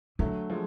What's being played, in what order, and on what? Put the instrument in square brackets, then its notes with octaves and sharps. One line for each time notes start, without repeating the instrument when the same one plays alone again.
[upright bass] D3 [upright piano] F#3 A3
[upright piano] F3 G#3